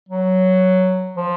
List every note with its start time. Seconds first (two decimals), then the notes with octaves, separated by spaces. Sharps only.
0.09 F#3
1.17 F3